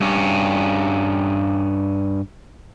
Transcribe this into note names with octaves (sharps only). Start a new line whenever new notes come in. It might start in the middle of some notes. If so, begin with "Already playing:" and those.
G2 C#4